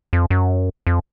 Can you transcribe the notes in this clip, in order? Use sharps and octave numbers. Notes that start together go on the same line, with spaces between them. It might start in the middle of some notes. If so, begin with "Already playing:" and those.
F2
F#2
F2